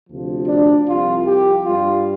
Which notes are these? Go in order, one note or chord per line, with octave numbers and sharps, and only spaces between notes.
D2 C3 F3
D4
C2 C3 F3 F4
G4
G2 G3 F4